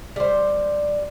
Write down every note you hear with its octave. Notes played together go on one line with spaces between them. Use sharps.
G3 C5